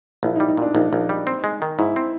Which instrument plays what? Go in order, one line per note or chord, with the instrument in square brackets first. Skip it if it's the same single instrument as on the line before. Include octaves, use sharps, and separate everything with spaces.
[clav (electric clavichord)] A#1 [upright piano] E4
[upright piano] D#4
[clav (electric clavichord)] G3
[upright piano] D#4
[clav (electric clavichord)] A#2 [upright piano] D4
[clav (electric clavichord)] A#1 [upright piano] D#4
[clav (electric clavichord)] A#1
G3
C4
G#3
D#3
[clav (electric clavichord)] G#2 [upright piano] E4
[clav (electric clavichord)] C4